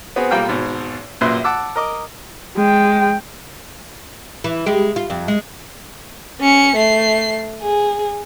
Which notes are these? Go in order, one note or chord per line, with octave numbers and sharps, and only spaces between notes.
B3 C4 F#4 G#4
B1 G3 A#3 F4 G5 F6
G#1 G#2 B2
A#1 F#2 A#2 B4 E5 C6
F#5 A5 D6 E6
A#4 D#5 D6
G#3 G5
E3
G#3 G4
F4
F2
G#3
C#4 C#7
A3 C7
G#4